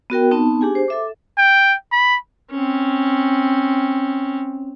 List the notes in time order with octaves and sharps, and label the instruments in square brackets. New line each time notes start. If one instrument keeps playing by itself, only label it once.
[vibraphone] B3 F#4 A#4 G5
B3 C4 D#4 A5
D4 G4 G#4 G#5
C5
A4 E5 D6
[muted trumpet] G5
B5
[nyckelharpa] C4 C#4